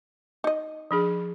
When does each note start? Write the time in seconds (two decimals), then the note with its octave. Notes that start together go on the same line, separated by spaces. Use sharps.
0.44 D#4 D#5
0.91 F3 D4 G#4